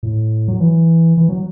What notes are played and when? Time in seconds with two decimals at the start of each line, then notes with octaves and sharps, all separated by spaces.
0.03 A2
0.48 F#3
0.60 E3
1.17 E3
1.29 F#3